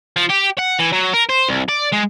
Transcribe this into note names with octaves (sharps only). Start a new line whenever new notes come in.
F3
G4
F#5
E3
F#3
A#4
C5
C2
D5
G#3